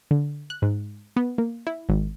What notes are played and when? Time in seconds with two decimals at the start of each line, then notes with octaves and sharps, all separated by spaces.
0.11 D3
0.50 F#6
0.62 G#2
1.16 B3
1.38 A#3
1.67 E4
1.89 G#1